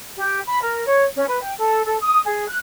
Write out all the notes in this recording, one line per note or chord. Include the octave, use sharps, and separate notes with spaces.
G4
B5
A#4
C#5
C#4
B4
G5
A4
A4
D#6
G#4
F#6